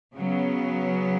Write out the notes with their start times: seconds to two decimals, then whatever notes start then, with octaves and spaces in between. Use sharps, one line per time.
0.16 C#3 F#3 B3